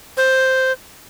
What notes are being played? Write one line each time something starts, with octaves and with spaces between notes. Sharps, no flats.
C5